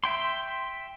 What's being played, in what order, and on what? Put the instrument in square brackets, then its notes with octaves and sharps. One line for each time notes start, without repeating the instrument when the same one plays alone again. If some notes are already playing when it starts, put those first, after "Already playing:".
[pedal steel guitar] E5 G5 C6